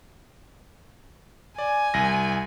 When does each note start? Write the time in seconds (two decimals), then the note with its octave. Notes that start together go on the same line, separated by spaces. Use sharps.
1.58 D5 G#5
1.94 C2 A#6